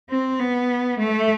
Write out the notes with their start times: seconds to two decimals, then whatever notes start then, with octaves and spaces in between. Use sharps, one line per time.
0.10 C4
0.40 B3
0.99 A3